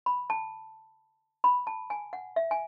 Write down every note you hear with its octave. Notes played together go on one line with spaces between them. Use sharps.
B5
A5
B5
A5
G#5
F#5
E5
G#5